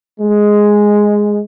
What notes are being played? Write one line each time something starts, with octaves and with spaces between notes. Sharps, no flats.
G#3